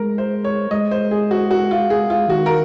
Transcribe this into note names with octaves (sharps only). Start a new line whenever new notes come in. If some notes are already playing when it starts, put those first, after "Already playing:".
Already playing: G#3 A#4
C5
C#5
G#3 D#5
C5
G#4
F#4
F#4
F4
G#4
F4
D#3 F#4
A#4